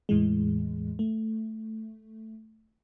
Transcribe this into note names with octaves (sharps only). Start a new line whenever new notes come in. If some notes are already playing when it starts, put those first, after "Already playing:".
E2 A2 E3 G#3
A3